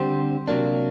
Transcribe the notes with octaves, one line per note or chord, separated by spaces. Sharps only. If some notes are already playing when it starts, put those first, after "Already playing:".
Already playing: D3 G3 C4 G4 C5
C3 F#3 A#3 D4